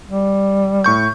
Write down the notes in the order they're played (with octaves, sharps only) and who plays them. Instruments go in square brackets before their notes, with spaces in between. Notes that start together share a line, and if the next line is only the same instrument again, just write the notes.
[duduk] G3
[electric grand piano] A2 C#6 G6